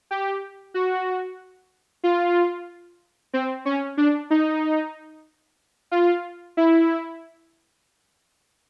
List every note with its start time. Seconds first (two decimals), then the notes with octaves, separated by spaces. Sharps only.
0.11 G4
0.74 F#4
2.04 F4
3.33 C4
3.65 C#4
3.97 D4
4.30 D#4
5.91 F4
6.57 E4